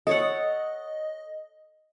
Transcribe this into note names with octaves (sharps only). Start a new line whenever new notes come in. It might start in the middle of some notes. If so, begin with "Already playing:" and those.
A4 C#5 D#5 F#5